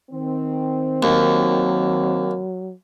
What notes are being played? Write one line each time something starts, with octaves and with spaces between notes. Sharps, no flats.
D#3 C4
D#2 F#3